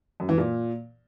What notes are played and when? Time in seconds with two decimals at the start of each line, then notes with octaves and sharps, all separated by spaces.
0.20 F#2
0.29 E3
0.38 A#2